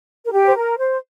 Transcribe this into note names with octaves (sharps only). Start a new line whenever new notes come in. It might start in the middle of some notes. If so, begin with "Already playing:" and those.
A#4
G4
C5
A#4
C5